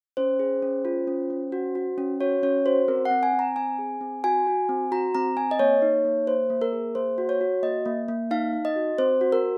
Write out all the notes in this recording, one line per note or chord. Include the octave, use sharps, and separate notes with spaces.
C#4 C5
G#4
C#4
F4
C#4
C#4
F#4
F#4
C#4
F#4 C#5
C#4 C#5
F#4 C5
C4 A#4
F#5
C4
G#5
C4
A#5
C4 G#5
G#4
C4
F#4 G#5
F#4
C4
F#4 A#5
C4 A#5
C4 G#5
D#5
A#3 C#5
D#4
A#3
A#3 C5
A#3
A#4
G#4
A#3 C5
F#4
C#5
F#4
A#3 D#5
A#3
A#3
D#4 F5
D#4
D#5
F#4
C4 C5
F#4
A#4